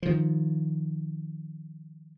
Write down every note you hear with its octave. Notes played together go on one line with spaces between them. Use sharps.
D#3 F3